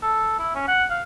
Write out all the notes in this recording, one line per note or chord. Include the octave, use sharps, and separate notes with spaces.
A4
E4
C#4
F#5
F5